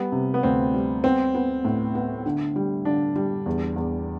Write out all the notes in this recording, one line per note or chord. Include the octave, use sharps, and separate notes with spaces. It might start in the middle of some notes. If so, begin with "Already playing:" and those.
Already playing: G3 B3
C3
B3
D2 C4
G3
B3 C4
B3
A2
B3
D3
G3
D3 D4
G3
E2
E2